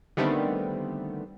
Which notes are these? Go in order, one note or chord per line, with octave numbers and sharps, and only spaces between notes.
D3 D#3 G3 A3 B3 C4